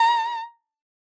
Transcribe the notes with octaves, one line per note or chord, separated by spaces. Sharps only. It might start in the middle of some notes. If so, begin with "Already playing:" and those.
Already playing: A#5